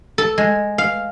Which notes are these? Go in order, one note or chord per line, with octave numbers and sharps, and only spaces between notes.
A4
G#3
F5